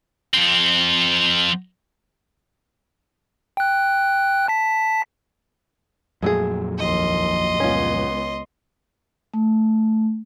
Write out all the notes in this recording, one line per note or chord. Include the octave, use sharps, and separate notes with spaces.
F2 C4
G5 F#6
A5 B6
F2 A#2 F#3 G#3 A3 G#4
A#1 D#2 D#5 C6
C#2 B3 C#4 F4
A3